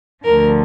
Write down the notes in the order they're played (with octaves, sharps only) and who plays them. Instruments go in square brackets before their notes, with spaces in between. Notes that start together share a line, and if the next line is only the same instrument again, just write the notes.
[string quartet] D2 D3 F3 A#4